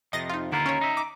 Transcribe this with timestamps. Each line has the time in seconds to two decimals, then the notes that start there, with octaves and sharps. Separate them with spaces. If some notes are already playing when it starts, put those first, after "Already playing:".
0.13 F2 C3 D#5 A6 A#6
0.29 D#4 F4
0.52 D#2 D3 E4 F4 A#5
0.66 C#4 C#5
0.81 D#4 E5
0.97 D6